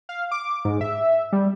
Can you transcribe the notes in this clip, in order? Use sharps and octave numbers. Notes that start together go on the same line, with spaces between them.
F5
D6
G#2
E5
G3